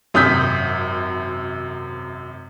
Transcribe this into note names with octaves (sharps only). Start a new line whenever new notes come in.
G#1 F#2 C3 D#6 G6 B6